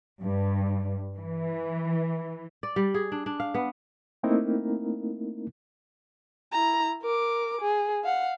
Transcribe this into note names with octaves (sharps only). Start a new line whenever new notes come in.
G2
E3
D5
G3
G#4
D4
D4
F5
B3
A3 A#3 C4 D#4 E4 A#4
E4 A#5
A#4 D6
G#4
F5 F#5